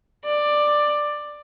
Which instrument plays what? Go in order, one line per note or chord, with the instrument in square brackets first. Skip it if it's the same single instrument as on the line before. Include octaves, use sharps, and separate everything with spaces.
[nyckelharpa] D5